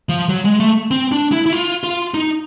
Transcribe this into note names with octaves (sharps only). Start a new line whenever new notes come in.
F3
F#3
G#3
A3
C4
D4
E4
E4
F4
F4
D#4